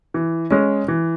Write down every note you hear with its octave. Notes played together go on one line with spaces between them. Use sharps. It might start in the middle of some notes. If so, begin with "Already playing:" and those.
E3
G#3 C#4
E3